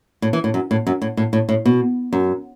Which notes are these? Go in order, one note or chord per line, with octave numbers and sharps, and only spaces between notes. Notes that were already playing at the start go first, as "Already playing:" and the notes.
A2
E3
A2
F#2
A2
F#2
A2
A2
A2
A2
B2
F#2